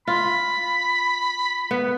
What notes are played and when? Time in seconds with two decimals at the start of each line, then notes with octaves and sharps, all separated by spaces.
0.07 F4 B5
1.71 B3